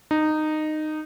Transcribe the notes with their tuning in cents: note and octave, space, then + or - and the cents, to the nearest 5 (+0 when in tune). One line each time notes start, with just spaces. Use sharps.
D#4 -15